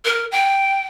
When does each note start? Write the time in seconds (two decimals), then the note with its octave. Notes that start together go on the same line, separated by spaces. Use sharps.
0.05 A#4
0.32 G5